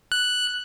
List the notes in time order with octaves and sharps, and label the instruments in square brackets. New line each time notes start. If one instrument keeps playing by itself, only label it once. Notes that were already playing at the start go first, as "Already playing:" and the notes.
[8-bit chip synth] F#6